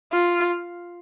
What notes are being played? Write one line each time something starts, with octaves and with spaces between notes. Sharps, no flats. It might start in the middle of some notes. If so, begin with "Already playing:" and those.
F4